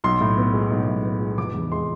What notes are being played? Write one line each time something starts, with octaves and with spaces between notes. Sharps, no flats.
B1 C6
A2
B3
G#3
B1
A2
B3
G#3
F1 D6
E2
G#3 C6